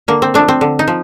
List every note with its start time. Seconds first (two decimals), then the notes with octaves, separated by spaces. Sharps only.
0.08 D3 A#3
0.22 C4
0.34 F3 A3 D4
0.48 C4
0.61 D3
0.79 D#4
0.88 F3